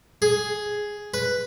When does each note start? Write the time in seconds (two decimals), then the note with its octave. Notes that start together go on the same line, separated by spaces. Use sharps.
0.22 G#4
1.14 B4